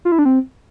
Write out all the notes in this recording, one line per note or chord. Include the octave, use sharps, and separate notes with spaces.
F4
E4
D4
C4